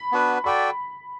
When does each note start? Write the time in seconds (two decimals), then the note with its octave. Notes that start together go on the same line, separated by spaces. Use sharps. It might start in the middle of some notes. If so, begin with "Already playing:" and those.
Already playing: B5
0.12 B3 D4 F#4 B4
0.44 F#4 A4 D5 G5 B5